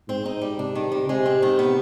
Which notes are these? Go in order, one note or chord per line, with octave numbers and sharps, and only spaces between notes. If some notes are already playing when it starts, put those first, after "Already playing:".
G#2 C4
D#4
G3
C3 D4
D#3
G3
C3 G#3
C4
D#3
B3